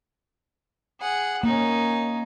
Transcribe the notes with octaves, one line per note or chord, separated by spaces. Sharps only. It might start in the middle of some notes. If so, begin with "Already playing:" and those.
G#4 F#5
A#3 C#4 D#4